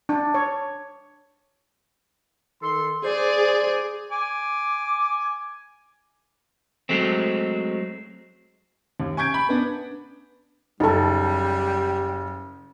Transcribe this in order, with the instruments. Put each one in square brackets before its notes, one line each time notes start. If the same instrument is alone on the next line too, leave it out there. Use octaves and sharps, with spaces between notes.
[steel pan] D4
C#5
[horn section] D#3 A4 C6
[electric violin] G#4 [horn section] C5 D5
[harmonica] G#5 D6
[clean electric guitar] F#3 G#3 A3 C4
[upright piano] D#2
G#5 C#6 G6 G#6 D7
B5
B3 D4
[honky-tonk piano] F#1 [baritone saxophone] G3 [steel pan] D#4 A4